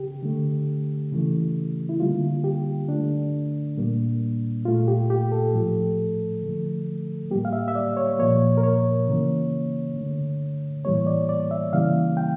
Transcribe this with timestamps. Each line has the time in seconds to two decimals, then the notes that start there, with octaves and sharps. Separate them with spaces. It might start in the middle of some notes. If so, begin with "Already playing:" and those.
Already playing: C#3 G4
0.23 D3 A3
1.12 C#3 E3 A3
1.89 E4
2.00 D3 G3 A#3 F4
2.44 G4
2.89 D3 A3 D4
3.77 A#2 G3 A#3
4.65 A#2 A3 F4
4.87 G4
5.10 G4
5.32 A4
5.53 A2 F3 A3
6.42 D3 F3 A3
7.31 A2 G3 A#3 G4
7.45 F5
7.53 E5
7.68 E5
7.75 D5
7.97 C#5
8.19 A#2 F3 A#3 C#5
8.57 A#4
8.63 C#5
9.08 C#3 E3 A#3
9.96 D3 A3
10.85 A2 E3 G3 A#3 C#5
11.07 D5
11.29 D5
11.51 E5
11.73 C#3 E3 G3 A#3 F5
12.17 G5